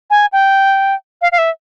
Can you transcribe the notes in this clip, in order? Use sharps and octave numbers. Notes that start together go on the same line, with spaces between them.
G#5
G5
F5
F5
E5